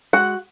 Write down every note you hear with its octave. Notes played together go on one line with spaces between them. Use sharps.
G#3 F#4 F#5